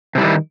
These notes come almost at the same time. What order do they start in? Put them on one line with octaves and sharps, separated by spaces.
C3 G3 E4 D#3